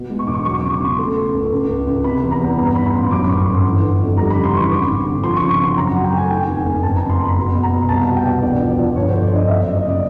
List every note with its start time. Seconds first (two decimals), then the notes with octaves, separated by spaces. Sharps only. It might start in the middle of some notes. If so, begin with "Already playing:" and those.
Already playing: B2
0.10 G#3
0.19 C#6
0.27 E1 D6
0.34 C#6
0.45 F#3 C#6
0.59 D6
0.62 C#3
0.72 C#6
0.80 C#3 C6
0.99 A3
1.16 A3
1.34 C#2
1.52 C#2
1.69 C#2
1.87 C#2
2.04 C3 B5
2.22 E2
2.31 A#5
2.40 E2
2.58 G2 A#5
2.75 D#3 B5
2.86 B5
2.93 A1 C6
3.10 F#2 D6
3.28 G1 C#6
3.46 G1 C6
3.64 E3
3.82 G1
4.00 F2
4.17 G3 A#5
4.30 B5
4.35 C#3
4.44 C6
4.53 E3 C#6
4.71 G#1 D6
4.88 G#1
5.05 D3
5.24 F3 C6
5.36 C#6
5.41 C#3
5.50 C#6
5.60 C#3 C6
5.77 F#2 A#5
5.90 F#5
5.94 F#3
6.04 G5
6.13 A3 G#5
6.30 D#3 G5
6.48 F1
6.57 G#5
6.66 F1
6.83 F#1 A5
6.96 A#5
7.01 C#3
7.10 C6
7.18 F#1
7.24 B5
7.37 B2 A#5
7.55 B2
7.63 A#5
7.71 B2
7.89 C2 A5
8.07 B2
8.16 G5
8.25 B2
8.42 E1 D5
8.60 F3
8.69 D5
8.78 F3
8.95 G1 C#5
9.09 C5
9.14 F3
9.23 D5
9.31 G1 D#5
9.48 F#1 E5
9.62 D#5
9.66 F#2
9.76 D#5
9.84 C#3 D5